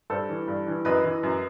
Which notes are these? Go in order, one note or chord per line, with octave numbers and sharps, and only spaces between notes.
G2 A4 C5
E3
G2
E3
F#2 B4 D#5
E3
F#2